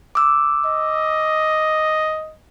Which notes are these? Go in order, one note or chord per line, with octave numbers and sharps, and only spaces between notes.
D6 E6
D#5